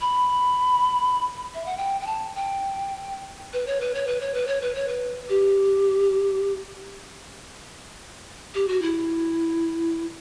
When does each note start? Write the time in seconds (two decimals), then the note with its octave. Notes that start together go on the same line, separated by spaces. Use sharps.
0.01 B5
1.55 E5
1.66 F#5
1.77 G5
2.01 G5
2.07 A5
2.36 G5
3.53 B4
3.67 C#5
3.81 B4
3.95 C#5
4.07 B4
4.21 C#5
4.34 B4
4.47 C#5
4.61 B4
4.75 C#5
4.88 B4
5.29 G4
8.54 G4
8.68 F#4
8.82 E4